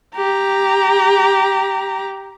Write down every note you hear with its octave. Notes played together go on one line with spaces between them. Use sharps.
G4 A#5